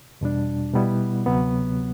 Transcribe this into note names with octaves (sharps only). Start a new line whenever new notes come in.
E2 B2 G3 D4
B2 G3 B3 E4
D2 C3 F#3 B3